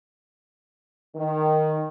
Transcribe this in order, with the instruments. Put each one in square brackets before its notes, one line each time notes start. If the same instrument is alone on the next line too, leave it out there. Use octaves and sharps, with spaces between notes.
[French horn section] D#3